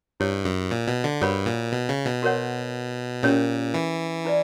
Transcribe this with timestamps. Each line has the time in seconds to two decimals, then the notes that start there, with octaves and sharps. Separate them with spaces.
0.20 G2 E4 G4 C#5
0.45 F#2
0.71 A#2
0.87 B2
1.04 D3
1.21 G2 F#4 A#4 C#5 F#5 B5
1.46 A#2
1.72 B2
1.89 C#3
2.05 B2
2.23 F#4 A#4 C#5 F#5
3.23 A#2 C#4 G4 A#4 C#5
3.74 E3
4.25 E4 B4 D5